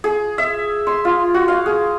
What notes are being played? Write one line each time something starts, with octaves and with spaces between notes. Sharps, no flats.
G#4
E5
C6
F4
F#4
F5
G#4